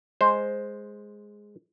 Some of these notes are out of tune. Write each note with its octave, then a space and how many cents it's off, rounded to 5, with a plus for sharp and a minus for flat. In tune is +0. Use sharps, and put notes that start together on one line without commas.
G#3 +0 C5 +0